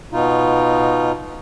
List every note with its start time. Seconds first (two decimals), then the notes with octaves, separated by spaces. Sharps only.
0.12 B2 D#4 F4